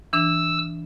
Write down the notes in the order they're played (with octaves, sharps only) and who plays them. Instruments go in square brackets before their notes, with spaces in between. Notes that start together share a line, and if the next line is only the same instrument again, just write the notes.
[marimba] E3 D4 [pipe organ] E6